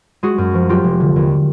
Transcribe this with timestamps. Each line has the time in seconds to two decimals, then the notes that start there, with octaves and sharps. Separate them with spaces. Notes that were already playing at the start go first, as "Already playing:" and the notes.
0.23 G#3 F#4 G#4
0.38 F#2
0.54 F3
0.69 F#3 F4 G4
0.84 F1
1.00 D3
1.16 D#2